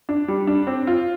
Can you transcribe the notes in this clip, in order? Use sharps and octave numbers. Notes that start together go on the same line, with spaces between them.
D4
G3
D4
C4
F4